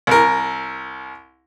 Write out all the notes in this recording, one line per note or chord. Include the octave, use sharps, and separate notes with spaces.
C2 A#4